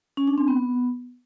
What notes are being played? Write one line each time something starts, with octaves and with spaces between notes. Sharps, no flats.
C#4
D4
C4
B3